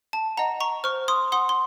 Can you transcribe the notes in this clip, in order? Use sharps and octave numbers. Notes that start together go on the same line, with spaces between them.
A5
D#5 F#5 A#5
A#5 C#6
C5 C#6 F6
C6 D#6
F#5 C6 D#6
C6